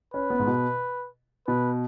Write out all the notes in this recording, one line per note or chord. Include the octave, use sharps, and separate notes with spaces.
C#4 B4
B3
G#2
B2
B2 B4